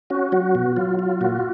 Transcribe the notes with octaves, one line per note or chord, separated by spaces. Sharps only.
C#4 F#4
F#3 F#4
B2
F#3 F4
F4
A#2 F#4